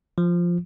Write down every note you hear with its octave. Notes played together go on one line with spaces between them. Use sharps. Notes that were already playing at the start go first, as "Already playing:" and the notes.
F3